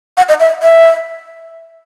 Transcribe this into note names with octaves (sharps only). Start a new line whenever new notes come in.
F#5
D#5
E5
E5